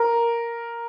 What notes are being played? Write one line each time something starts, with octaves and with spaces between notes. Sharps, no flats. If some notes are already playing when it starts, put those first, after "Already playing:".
Already playing: A#4